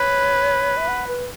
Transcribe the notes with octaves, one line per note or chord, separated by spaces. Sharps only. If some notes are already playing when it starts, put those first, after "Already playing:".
Already playing: B4 C#5
E5
F#5
B4